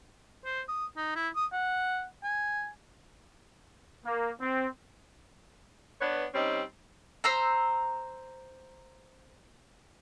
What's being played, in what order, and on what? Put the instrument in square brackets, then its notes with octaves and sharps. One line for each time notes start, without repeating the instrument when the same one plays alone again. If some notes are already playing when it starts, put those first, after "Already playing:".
[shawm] C5
D#6
D#4
E4
D#6
F#5
G#5
[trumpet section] A#3
C4
[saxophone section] B3 D4 B4 C#5
G3 C4 C#4 D#4
[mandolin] C5 A#5 E6